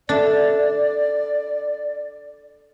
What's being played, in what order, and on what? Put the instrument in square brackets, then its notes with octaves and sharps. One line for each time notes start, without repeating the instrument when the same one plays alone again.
[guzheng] D4 [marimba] A4 E5 [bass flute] D5